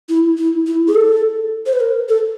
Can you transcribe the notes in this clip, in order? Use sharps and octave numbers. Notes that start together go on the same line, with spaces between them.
E4
E4
E4
G#4
A4
C5
B4
A#4
A4